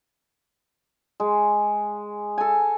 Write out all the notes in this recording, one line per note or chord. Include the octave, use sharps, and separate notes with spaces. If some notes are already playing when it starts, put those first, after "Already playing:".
G#3
A4 G#5